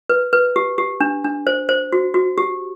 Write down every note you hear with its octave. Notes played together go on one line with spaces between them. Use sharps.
B4
B4
G4
G4
D4
D4
C5
C5
F#4
F#4
G4